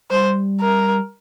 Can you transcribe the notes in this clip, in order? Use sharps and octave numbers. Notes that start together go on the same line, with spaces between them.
G3 C5
A#4